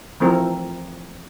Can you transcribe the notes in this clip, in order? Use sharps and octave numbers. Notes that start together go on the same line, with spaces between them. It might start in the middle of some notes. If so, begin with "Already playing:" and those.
E3 F3 A3 C4 A#4